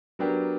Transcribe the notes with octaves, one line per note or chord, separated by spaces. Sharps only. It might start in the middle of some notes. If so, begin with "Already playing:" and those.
F#3 B3 D4 G4 A#4